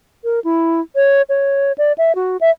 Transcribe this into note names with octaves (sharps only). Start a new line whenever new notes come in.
A#4
E4
C#5
C#5
D5
E5
F#4
E5